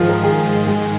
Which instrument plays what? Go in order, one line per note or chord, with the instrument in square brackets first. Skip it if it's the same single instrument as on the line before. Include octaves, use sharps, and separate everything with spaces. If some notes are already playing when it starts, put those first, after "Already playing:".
Already playing: [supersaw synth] G#2 D#3 G#3 [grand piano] F3 F4
[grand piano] A#4
G#4
G#3